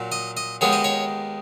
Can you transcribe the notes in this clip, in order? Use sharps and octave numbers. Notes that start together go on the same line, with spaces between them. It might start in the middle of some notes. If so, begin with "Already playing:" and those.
Already playing: A#2 F#3
D#5
D#5
D#2 D#3 G#3 B3 C#5
D#5
C#5